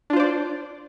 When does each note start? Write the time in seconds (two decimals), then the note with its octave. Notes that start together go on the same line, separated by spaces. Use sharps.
0.10 D4
0.13 F4
0.16 C5
0.20 D5